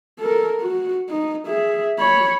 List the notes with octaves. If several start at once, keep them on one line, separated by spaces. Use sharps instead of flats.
A4 A#4
F#4
D#4
G#4 E5
C#5 B5